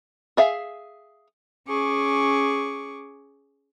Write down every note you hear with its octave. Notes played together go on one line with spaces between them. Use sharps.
G#4 E5 F5
C#4 G#4 C#6 D6